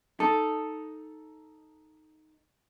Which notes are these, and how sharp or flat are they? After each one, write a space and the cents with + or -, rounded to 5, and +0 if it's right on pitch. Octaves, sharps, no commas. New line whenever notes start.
D#4 +0 A4 +0 A5 +0